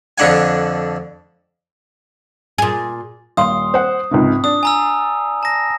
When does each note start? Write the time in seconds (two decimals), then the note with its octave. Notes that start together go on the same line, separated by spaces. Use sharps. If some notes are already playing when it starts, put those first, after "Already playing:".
0.18 F2 D3 D4 F#5 G#5
2.58 A#2 G#4
3.37 D#1 F5 C6 D#6
3.74 C5 F#5
4.11 C#2 G#2 C3
4.44 D4 D#6
4.63 G#5 A#5 E6
5.43 A5 A#6